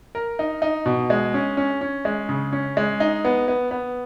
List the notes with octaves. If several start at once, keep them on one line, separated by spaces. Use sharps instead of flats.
A#4
D#4
D#4
B2
G#3
C#4
C#4
C#4
G#3
C#3
C#4
G#3
D#4
B3
B3
B3